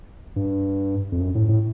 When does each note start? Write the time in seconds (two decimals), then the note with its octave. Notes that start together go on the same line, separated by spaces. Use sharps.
0.36 G2
1.12 F2
1.21 F#2
1.35 A2
1.49 A2